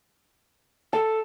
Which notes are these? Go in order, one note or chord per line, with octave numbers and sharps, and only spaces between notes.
A4 A5